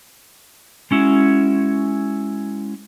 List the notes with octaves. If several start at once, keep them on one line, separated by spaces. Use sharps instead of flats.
G#3 C#4 E4 F#4